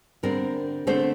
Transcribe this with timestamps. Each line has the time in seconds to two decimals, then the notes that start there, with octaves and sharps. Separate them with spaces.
0.23 D3 G3 C4 A#4
0.87 D3 A3 C4 C5